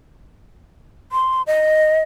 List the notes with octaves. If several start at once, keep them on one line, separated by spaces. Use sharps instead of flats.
C6
D#5